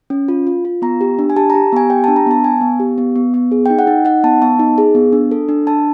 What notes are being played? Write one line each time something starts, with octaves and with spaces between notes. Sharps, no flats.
C#4
F4
F4
F4
B3 A#5
G4
D4
G#5
G4 A5
A#5
G4
B3 G#5
G4 G5
A5
D4
A#5
B3 A5
B3 G#5
B3
G4
B3
B3
B3
G#4
G5
D#4
F#5
D#4
D#4 F#5
B3 A5
B3 A5
D#4
G#4
B3
D4
A4
D4
D4 A5